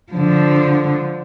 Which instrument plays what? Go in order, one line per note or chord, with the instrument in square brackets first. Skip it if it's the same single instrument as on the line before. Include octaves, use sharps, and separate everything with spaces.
[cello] D3 F3